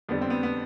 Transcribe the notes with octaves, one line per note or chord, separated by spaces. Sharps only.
F2 D3 G3 B3
C4
B3
B3